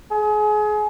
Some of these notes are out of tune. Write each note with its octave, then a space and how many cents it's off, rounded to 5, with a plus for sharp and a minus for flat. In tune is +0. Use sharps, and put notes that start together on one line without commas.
G#4 +30